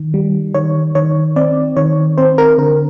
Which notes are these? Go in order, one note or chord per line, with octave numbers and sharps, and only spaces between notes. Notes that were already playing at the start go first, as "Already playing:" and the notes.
Already playing: D#3
G3
D#3 C#5
D#3 C#5
C4 D5
D#3 C#5
C4 C5
A#4
D3 A#4